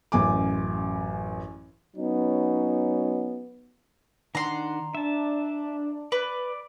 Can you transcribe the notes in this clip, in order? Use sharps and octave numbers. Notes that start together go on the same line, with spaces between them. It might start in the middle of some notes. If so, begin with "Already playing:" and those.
A1 F#2 G#5 D6
F#3 B3 C#4 D#4
D#3 D4 F#5 A#5 C6
D4 E5 A5
B4 D5